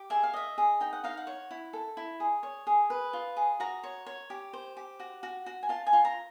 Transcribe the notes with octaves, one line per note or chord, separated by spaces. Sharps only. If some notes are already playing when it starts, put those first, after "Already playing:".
Already playing: G4
G#4 E5
F5
D#5 E5
G#4
D#4 G5
F#5
D#4 F5
F#5
C#5
E4
A4
E4
G#4
C#5
G#4
B4
F4
G#4
F#4 A#5
C#5
C#5
G4
C5
G4
F#4
F#4
F#4
G#5
F4 A5
G#5
F4
A#5